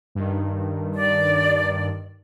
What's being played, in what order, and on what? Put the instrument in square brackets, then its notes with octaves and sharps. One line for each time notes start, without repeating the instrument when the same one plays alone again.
[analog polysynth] G2 D#3
[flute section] D5